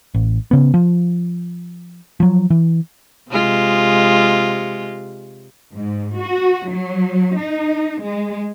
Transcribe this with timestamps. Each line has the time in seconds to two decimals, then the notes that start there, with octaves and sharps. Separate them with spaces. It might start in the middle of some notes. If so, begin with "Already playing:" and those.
0.15 A1
0.51 C#3 B3
0.74 F3
2.20 F3 F#3
2.50 E3
3.31 C3 G#3 F4
5.76 G#2
6.18 F#4
6.69 F#3
7.41 D#4
8.02 G#3